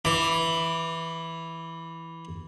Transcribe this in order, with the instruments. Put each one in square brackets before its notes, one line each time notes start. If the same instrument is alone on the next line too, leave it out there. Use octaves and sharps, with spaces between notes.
[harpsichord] E3 D6